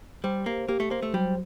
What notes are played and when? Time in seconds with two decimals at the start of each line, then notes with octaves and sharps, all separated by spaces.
0.24 G3 C5
0.46 A#3 G4
0.68 A#3 G4
0.80 A3
0.91 A#3 C5
1.03 A3
1.14 F#3 G3